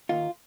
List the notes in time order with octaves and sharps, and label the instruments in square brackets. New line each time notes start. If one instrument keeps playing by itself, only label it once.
[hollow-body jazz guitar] D#2 D#3 A#3 D#4 F4